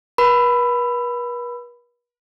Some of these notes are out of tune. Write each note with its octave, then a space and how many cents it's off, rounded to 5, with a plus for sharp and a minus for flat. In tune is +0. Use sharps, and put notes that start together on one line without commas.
B4 -45 B5 +10